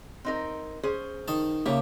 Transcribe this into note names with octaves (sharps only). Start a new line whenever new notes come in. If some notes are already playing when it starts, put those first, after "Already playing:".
C4 D#4 A#4
C#4 G#4 C5
D#3 D#5 A5
C#3 A#3 G4 E5 A5